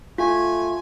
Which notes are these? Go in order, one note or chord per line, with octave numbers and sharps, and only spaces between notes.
A3 F4 G#5